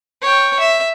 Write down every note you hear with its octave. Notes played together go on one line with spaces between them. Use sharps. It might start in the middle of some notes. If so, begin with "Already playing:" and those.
C#5 G5
E5